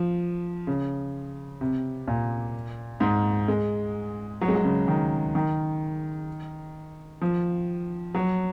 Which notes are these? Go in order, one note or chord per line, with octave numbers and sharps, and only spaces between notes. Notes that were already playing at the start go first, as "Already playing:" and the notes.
Already playing: F3
C#3
C3
A#2
G#2
G#3
F#3
G#3
F#3
C#3
D#3
D#3
F3
F#3